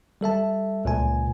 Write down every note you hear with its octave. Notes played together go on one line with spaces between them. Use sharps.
G3 A4 E5 A5
C#2 A#2 G#5